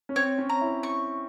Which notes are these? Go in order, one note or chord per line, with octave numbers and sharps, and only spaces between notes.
C#4
C4 C#5
C#4
A#5
E4
C#6